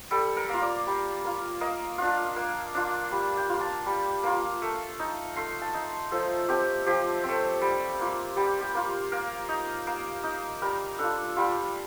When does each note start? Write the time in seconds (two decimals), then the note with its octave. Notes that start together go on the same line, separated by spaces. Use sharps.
0.11 G3 A4
0.37 A#4
0.49 A#3 F4
0.62 D5
0.87 G3
1.24 A#3 F4
1.61 A#3 D#5
1.98 D4 F4
2.36 A#3
2.74 D4 F4
3.12 G3
3.37 G5
3.49 A#3 F4
3.61 A5
3.86 G3
4.23 A#3 F4
4.62 A3
4.99 D#4
5.36 A3 C6
5.62 A5
5.74 D#4
6.11 F3 A4
6.48 A3 C4 G4
6.86 F3 G4
7.24 A3 C4
7.61 G3
7.99 A#3 F4
8.36 G3 G4
8.61 G4
8.74 A#3 F4
9.12 A#3 A#4
9.49 D#4
9.87 A#3
10.24 D#4
10.62 G3 A#4
10.99 D4 F4 A4
11.36 G3 F4